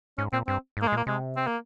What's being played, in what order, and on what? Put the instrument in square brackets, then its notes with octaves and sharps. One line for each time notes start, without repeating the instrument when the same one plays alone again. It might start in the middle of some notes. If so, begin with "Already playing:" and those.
[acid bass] G#2 [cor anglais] C#4
[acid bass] A#2 [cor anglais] C4
[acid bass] G2 [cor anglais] C4
[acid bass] G#2
[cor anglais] A#3
G#3
[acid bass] A#2 [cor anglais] A#3
[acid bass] C3 [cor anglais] G#3
[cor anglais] C4
A#3